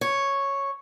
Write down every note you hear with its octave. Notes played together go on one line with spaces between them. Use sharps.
C#5